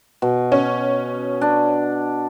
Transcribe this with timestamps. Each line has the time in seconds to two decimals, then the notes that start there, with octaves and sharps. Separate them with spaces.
0.22 B2
0.52 C#4
1.41 D4